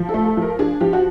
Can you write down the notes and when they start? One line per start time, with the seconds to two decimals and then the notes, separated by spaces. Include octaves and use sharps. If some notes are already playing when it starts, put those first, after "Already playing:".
Already playing: F3
0.09 A4
0.14 A3
0.25 A4
0.37 F3 A#4
0.59 D4 G#4
0.81 F3 G4
0.93 F#4